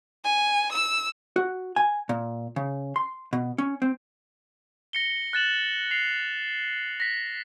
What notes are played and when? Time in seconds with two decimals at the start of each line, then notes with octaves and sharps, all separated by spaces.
0.24 G#5
0.72 E6
1.36 F#4
1.76 G#5
2.09 A#2
2.56 C#3
2.96 C6
3.33 B2
3.58 C#4
3.82 C4
4.93 A#6 C#7 G7
5.33 F#6 A6 E7 F#7
5.91 C7 F7
7.00 A#6 B6